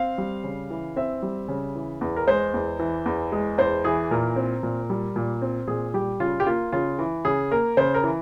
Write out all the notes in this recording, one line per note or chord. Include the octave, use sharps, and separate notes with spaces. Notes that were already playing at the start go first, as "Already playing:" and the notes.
Already playing: C4 F5
G3
C#3
E3
C4 E5
G3
C#3
E3
E2
A#4
G#3 C5
E2
E3
E2
G#3
E2 C5
E3 G#4
A#2 A#4
C4
A#2
G3
A#2
C4
A#2 G#4
G3 G4
C#3 F4
G4
A#3 F4
C#3 F4
E3
C#3 G#4
A#3 A#4
C#3 C5
A#4
E3